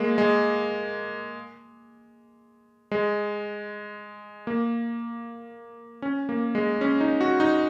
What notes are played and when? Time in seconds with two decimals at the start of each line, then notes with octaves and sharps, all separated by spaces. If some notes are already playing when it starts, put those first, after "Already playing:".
Already playing: G#3 A#3
0.18 G#3
2.91 G#3
4.47 A#3
6.02 C#4
6.29 A#3
6.55 G#3
6.81 C#4
7.01 D#4
7.21 F#4
7.40 D#4